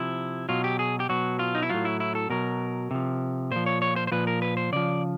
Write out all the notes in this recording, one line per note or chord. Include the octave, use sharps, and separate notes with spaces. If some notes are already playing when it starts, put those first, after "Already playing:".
Already playing: C3 F3 E4
B2 F#3 F4
G4
G#4
G4
B2 F#3 F#4
F4
D#4
E4
A2 F#3 F4
E4
E4
A4
B2 F#3 A#4
C3 F3
A#2 F3 C5
C#5
C#5
C5
C5
A#2 F3 B4
A#4
B4
C5
C#3 F3 D5